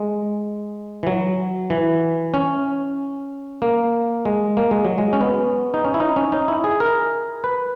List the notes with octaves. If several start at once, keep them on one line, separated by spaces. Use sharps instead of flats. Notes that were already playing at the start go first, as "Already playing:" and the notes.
Already playing: G#3
E3
F#3
E3
C#4
A#3
G#3
A#3
G#3
F#3
G#3
C#4
B3
D#4
C#4
E4
D#4
C#4
D#4
E4
G#4
A#4
B4